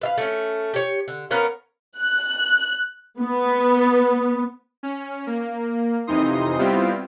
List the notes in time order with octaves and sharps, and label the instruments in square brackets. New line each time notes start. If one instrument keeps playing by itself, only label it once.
[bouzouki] B4 E5 F5
A3 C#4
G4 C#5
D3
B3 C#4 A#4 F5
[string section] F#6
B3
[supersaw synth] C#4
A#3
F2 C3 E3 D#4 C6 D#6
G3 B3 C4 E4 F4 G4